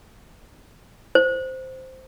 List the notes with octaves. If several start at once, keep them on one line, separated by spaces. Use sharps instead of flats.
C5